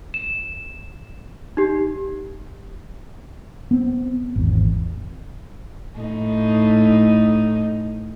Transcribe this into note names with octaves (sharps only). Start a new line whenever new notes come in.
E7
D#4 G4
B3 C4
G#1 E2
A2 D#4